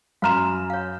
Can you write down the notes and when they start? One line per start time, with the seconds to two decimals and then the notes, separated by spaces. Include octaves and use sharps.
0.22 F#2 F5 A#5 C6 F6 E7
0.70 C#5 F5